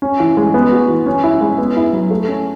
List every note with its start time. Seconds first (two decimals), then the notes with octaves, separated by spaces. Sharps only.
0.02 C#4
0.20 E3
0.37 G#3
0.54 B3
0.72 F#4
0.89 E3
1.06 C#4
1.23 E4
1.41 G#3
1.58 B3
1.76 E4
1.93 F#3
2.11 A3
2.28 C#4